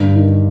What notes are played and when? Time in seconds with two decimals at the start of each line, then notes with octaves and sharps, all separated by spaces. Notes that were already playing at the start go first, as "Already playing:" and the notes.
Already playing: G2 D3
0.16 D#3